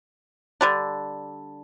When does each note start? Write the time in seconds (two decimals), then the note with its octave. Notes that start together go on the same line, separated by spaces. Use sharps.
0.61 D3 G3 D4